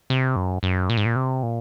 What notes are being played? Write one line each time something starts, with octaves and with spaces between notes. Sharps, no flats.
C3
F#2
F#2
A#2
G#2
A#2
C3
A#2